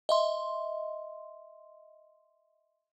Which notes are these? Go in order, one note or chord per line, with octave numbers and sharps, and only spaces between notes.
D#5 E5 C6